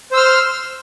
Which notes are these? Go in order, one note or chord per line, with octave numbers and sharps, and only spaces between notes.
C5 C6 E6 F6